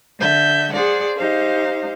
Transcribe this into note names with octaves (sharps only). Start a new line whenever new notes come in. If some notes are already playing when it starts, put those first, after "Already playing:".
D3 E5 G6
G#4 C5 D5 F#5
D#4 G4 C5 F5